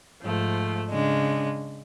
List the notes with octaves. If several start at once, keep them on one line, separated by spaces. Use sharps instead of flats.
G#2 F3 A3
C#3 G#3 D4